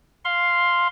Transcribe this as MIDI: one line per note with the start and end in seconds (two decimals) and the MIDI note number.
0.25 0.88 77
0.25 0.88 84